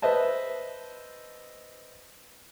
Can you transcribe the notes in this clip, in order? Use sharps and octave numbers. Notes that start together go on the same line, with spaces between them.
B4 C5 D#5 E5 A5